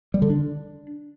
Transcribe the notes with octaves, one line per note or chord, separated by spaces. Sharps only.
G3
D3
D4